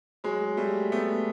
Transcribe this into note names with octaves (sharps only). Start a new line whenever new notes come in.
F#3 G#3
G3 A3
A3 B3